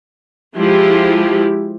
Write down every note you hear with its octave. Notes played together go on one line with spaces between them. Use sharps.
F3 G#3 E4 G4